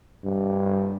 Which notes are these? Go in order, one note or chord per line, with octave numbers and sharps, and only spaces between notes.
G2